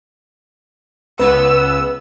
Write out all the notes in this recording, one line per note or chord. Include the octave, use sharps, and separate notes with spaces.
C#2 B3 B4 E6